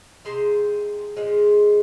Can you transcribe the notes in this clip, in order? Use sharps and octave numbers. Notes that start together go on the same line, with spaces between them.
C3 G#3 G#4 C5
A#2 F3 G#3